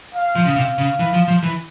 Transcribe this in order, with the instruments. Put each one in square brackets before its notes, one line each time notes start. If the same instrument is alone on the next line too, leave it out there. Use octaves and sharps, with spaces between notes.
[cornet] F5
[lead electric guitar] F3
C#3
[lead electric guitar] C3 [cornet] F5
[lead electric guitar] C#3
E3
F3
F3
E3